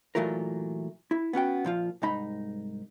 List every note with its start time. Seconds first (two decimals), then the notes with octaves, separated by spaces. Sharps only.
0.15 A#2 E3 F#3 A3 F4 A#4
1.11 E4
1.33 B3 C#4 F#4 G5
1.64 A#2 F3 F4
2.02 C2 G#2 D#4 B5